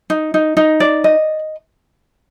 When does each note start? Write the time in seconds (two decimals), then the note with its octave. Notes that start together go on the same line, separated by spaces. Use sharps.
0.10 D#4
0.34 D#4
0.57 D#4
0.80 D5
1.04 D#5